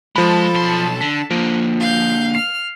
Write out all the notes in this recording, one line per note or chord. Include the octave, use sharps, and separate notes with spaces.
F3 G#3 A4 A5 B5
B1 C6
D3 B6
D3 F3 A#3
F5 G6
F6 C7